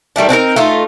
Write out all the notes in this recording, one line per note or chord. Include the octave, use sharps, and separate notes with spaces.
D#3 G3 A3 D4
C4 D4 D#4 A#4
A3 D#4 F4